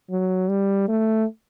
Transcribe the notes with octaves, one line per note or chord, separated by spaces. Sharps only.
F#3
G3
A3